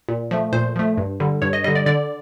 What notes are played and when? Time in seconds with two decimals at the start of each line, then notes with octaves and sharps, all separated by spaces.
0.09 A#2
0.31 F3 A3
0.53 A#2 C5
0.76 F3 A3
0.98 G2
1.20 D3 G3
1.42 G2 C#5
1.53 D#5
1.64 D3 G3 D#5
1.75 D5
1.86 D3 D5